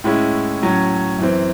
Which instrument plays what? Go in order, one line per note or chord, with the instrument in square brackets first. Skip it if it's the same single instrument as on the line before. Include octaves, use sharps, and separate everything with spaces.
[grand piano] A2 G#3 C#4 E4
A2 F#3 C#4
F#2 E3 C4